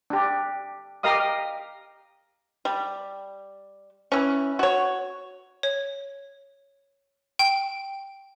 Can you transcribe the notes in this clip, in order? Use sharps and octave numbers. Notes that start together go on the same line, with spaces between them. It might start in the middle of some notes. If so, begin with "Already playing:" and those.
D4 G4
G4 A#4 D#5 F5 D#6
G3
E3 C#4
F#4 C#5
C#5
G5